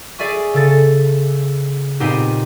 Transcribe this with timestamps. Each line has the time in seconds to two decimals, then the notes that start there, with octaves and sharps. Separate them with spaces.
0.19 G#4 D5 E5 G#5 C#6
0.54 C#3 A4 A6
2.00 A#2 B3 C4 D#4 G4